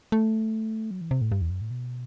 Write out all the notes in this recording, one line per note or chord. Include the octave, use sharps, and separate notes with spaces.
A3
F#3
E3
C3
A2
G2
E2
F#2
A2
B2